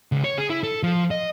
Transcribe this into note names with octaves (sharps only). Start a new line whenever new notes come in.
C#2
C#5
G#4
E4
A4
F3
D#5